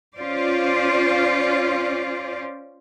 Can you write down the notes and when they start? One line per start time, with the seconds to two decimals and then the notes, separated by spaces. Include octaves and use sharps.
0.15 C#4 F4 C5 D5